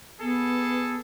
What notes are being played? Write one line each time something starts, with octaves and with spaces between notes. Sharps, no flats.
B3 G#4 A4